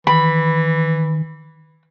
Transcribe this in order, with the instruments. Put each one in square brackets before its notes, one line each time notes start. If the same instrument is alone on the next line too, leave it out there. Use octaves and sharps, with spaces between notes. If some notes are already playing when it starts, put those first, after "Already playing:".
[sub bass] D#3 [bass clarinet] E3 [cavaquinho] B5